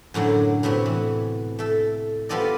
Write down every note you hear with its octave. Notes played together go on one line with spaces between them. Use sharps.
F#2 A2 D3 F#3
A2 C3 B3 F#4
E3
A3 A4
G3 B3 F4 A4 D5 D#5